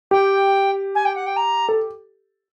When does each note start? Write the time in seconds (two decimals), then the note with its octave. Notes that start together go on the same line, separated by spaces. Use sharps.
0.11 G4 G5
0.95 G#5
1.05 G5
1.15 F#5
1.26 G5
1.36 A#5
1.69 A4